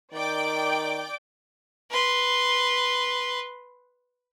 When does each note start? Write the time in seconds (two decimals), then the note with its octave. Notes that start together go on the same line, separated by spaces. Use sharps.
0.13 D#3 D5 G5 D6
1.90 B4 C6